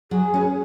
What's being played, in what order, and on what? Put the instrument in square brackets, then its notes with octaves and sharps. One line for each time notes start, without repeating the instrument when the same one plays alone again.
[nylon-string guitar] F#3 [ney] G#4
[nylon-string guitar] C#4 F#4 B4